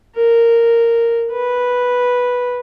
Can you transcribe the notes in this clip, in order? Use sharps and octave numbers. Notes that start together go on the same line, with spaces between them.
A#4
B4